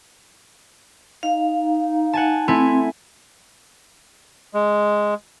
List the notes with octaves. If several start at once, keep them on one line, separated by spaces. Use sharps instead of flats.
D#4 F5
F#5 G#5 A5
A3 C4 E4 G#5
G#3